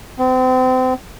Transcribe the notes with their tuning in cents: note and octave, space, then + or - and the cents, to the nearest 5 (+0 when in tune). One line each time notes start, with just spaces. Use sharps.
C4 -35